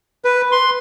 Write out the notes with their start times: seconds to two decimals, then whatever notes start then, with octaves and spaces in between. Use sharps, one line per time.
0.25 B4
0.52 C6